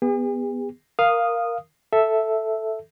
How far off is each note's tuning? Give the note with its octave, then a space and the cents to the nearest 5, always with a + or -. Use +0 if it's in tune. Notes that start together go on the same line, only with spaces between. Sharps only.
B3 +0 G#4 -45
A#4 +0 F5 +0 D#6 -10
A4 +0 E5 +0